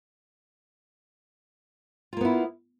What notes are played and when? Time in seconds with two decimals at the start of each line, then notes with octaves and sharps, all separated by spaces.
2.13 F4
2.17 A#3
2.21 B3
2.25 E4